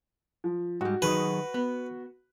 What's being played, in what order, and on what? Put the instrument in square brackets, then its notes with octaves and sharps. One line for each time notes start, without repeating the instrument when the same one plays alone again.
[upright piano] F3
[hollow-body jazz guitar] G#2 G3 [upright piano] F#4
[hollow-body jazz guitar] D#3 F#3 G#4 [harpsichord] B4
[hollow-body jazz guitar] B3